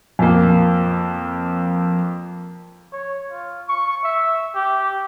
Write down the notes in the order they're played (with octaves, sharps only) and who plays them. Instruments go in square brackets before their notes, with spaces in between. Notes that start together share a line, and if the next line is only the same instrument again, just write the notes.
[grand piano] F2 A#3
[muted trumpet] C#5
F4
C#6
E5
G4